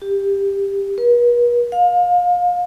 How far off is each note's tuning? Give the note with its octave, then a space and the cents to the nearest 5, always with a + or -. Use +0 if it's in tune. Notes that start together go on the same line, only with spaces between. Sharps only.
G4 +15
B4 -45
F5 +30